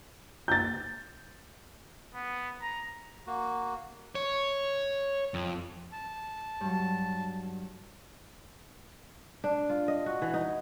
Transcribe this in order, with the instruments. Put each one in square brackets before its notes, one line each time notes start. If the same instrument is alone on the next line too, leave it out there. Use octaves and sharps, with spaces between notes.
[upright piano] G6 A6
[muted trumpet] B3
A#5
[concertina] A#3 F#4
[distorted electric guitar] C#5
F2
[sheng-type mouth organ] A5
[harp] G2 F#3
[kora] D4
F4
D#5
F#4
E3
D#4